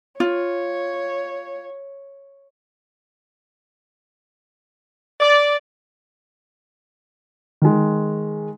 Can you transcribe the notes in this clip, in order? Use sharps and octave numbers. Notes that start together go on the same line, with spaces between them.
F4 C#5
D5
D#3 G#3